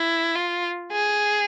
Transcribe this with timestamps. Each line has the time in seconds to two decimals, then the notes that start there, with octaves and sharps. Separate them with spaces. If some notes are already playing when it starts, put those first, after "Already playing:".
Already playing: E4
0.35 F4
0.92 G#4